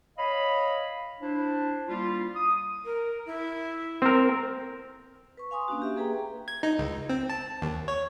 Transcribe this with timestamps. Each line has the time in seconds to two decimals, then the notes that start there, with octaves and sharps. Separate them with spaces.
0.18 C#5 D#5 F5 B5
1.21 D4 E4 C5
1.88 G3 A#3 E4 F4
2.35 D#6
2.85 A#4
3.26 E4
4.02 C4 A#4
5.37 B4 C#6
5.51 F5 G#5 C6 D#6
5.68 A#3 C#4 D4 F#4
5.82 G4 E5
5.96 A#3 G#4 B4 G5 A#5
6.48 G#6
6.63 D#4
6.79 C#2
7.09 C4
7.29 A5
7.62 D#2
7.88 C#5